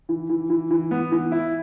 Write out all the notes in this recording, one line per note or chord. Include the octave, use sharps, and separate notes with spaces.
E3
E3
E3
E3
B3
E3
E4